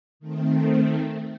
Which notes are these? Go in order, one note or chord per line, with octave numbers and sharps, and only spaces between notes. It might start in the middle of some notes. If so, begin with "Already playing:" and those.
D#3 A3 C4